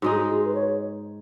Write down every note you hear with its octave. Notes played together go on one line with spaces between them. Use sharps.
G#2 G#3 D#4 F#4
G#4
F#4
G#4
B4
C#5